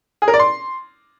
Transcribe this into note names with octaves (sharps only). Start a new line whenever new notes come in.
G#4
A#4
D5
C6